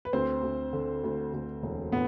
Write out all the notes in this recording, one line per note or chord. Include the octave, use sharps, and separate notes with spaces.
B4
D2 C4 C5
D2
D3
D2
D2
E1
A2 B3